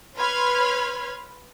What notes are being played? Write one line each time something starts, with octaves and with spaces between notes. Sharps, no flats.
B4 C#5 B5 C6 F6 G#6